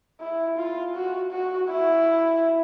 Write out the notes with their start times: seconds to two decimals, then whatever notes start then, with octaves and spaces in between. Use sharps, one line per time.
0.21 E4
0.57 F4
0.95 F#4
1.31 F#4
1.69 E4